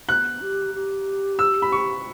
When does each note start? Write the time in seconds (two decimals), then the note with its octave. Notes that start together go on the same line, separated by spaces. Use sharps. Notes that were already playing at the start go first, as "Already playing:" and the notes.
0.09 B3 F#6
0.40 G4
0.74 G4
1.39 E6
1.62 B5
1.72 C#6